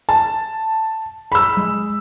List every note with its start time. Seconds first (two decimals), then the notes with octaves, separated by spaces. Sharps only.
0.09 A5
1.32 B5 E6
1.57 G#3